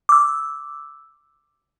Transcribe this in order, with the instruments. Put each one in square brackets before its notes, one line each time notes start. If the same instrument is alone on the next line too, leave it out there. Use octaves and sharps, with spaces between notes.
[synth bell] D6 E6